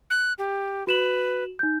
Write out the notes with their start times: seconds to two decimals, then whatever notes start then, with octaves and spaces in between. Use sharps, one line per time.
0.10 F#6
0.38 G4
0.87 F#4 B4 E7 F#7
1.59 D#4 G6